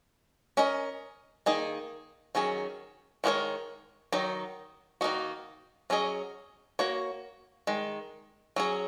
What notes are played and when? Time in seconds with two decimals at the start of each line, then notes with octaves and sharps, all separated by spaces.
0.57 C#4 A#4 D#5
1.46 D#3 A#3 D#4 G#4
2.35 D#3 F#3 C#4 G#4
3.24 D#3 G#3 F#4 A#4 C#5
4.12 D#3 F#3 D#4
5.01 D#3 A#3 D#4 F#4
5.90 F#3 C#4 G#4 D#5
6.79 A#3 F#4 C#5
7.67 D#3 G#3
8.56 F#3 C#4 G#4